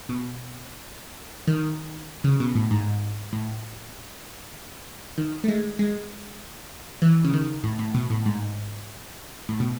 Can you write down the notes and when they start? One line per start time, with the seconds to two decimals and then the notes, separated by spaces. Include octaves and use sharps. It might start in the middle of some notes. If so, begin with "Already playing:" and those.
0.09 B2
1.47 D#3
2.24 C#3
2.40 B2
2.55 A2
2.71 G#2
3.33 A2
5.18 D#3
5.44 A3
5.48 G#3
5.79 G#3
7.02 E3
7.25 C#3
7.34 D#3
7.64 A2
7.79 A2
7.95 B2
8.10 A2
8.26 G#2
9.49 A2
9.60 B2